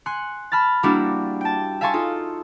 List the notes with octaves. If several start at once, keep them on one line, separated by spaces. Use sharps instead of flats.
G#5 C6 F#6 C#7
A5 B5 F6 A6
G3 A#3 D4 E4 F#4 G4
G5 A5
E5 F5 G#5 A5 C6 C#6
D#4 F4 A4